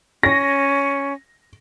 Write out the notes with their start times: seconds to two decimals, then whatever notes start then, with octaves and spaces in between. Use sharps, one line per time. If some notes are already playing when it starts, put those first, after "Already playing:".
0.23 C#4 A#6